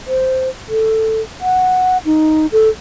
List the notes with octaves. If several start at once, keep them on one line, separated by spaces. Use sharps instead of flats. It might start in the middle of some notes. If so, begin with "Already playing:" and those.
C5
A4
F#5
D#4
A4